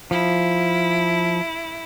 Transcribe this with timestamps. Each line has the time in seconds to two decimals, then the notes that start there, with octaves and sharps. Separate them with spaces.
0.11 F3 E4